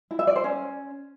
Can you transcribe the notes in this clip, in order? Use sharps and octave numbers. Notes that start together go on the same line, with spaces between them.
E4
E5
D5
C5
C#4